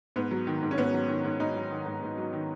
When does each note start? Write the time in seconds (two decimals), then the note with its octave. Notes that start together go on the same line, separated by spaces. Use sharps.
0.16 G#2 B3
0.31 F#3
0.47 D#3
0.62 G#2
0.71 C#4
0.78 G#2 B3
0.94 F#3
1.09 D#3
1.25 G#2
1.40 G#2 D#4
1.56 F#3
1.71 D#3
1.86 G#2
2.03 G#2
2.18 F#3
2.33 D#3